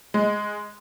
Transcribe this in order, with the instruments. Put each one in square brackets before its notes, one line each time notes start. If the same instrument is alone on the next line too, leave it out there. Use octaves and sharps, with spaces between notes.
[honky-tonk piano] G#3